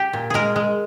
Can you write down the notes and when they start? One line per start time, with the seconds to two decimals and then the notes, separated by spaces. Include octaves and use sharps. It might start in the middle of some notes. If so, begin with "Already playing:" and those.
Already playing: G4
0.13 A#2
0.30 G#3 G#4 A#4
0.56 G#3